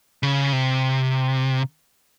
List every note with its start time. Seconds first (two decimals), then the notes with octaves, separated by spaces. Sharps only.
0.23 C#3
0.53 C3